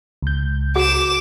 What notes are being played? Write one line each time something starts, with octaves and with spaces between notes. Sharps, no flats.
C#2 G6
F#4 G#4 F#5 D6 E7